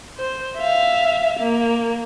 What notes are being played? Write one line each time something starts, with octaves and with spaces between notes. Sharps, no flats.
C5
E5 F5
A#3